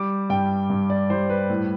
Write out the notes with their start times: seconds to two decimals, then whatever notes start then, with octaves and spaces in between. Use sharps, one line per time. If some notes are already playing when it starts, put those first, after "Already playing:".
Already playing: G3 D6
0.30 G2 G5
0.70 G2
0.90 D5
1.10 G3 C5
1.30 B4
1.50 A2